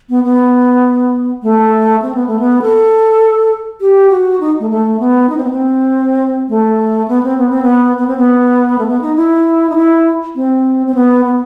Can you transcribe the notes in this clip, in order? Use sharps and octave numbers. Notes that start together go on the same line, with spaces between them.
B3
B3
A3
C4
B3
A3
B3
A4
G4
F#4
D#4
A3
A3
B3
D#4
C4
B3
C4
A3
B3
C4
B3
C4
B3
B3
C4
B3
A3
B3
D#4
E4
D#4
E4
C4
C4
B3
B3